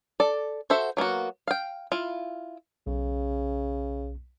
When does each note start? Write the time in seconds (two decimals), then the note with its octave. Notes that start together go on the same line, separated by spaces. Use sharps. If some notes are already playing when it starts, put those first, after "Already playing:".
0.20 A4 D5
0.70 F#4 A4 C5 E5
0.97 F#3 A#3 B3 F#4
1.48 F5 G5
1.92 E4 F4
2.87 B1 C#3